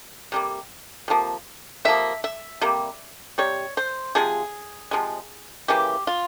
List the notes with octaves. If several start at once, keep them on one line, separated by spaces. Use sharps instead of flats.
C3 G3 A#3
C3 F3 A#3
C3 F3 A#3 E5
E5
C3 G3 A#3
C3 G3 C#5
C5
C3 F3 G#3 G#4
C3 F3 G#3
C#3 E3 A#3 G4
F4